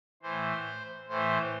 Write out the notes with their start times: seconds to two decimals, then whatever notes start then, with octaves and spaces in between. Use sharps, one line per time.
0.22 A2 E3 C5
1.08 A2 E3 C5